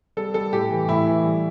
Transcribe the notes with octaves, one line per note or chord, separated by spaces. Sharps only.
G3 A4
G3 A4
A2 G4
E3
A2 E4
E3
G3